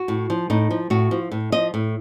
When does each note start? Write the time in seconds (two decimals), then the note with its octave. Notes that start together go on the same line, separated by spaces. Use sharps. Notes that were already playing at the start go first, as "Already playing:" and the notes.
Already playing: F#4
0.08 A2
0.30 F3
0.50 A2 D#4
0.71 F3
0.90 A2 F#4
1.11 F3
1.31 A2
1.52 F3 D#5
1.74 A2